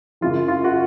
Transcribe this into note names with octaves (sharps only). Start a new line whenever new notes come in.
F#2 C#3 F#3 F4
F4
F#4